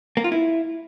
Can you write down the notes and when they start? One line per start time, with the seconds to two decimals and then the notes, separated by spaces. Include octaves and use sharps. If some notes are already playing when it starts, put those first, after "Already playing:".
0.17 A#3
0.24 F4
0.32 E4